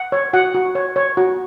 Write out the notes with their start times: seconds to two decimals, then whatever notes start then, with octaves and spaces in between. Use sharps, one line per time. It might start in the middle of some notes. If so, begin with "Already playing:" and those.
Already playing: F#5
0.12 C#5
0.33 F#4 F#5
0.54 F#4
0.75 C#5
0.96 C#5
1.17 F#4